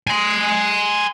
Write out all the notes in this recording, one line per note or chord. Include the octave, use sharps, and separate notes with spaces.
G#5 C6